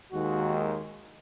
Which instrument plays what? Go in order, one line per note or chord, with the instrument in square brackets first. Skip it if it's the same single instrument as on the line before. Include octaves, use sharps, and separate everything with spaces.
[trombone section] D#2 D#3 G#3 F#4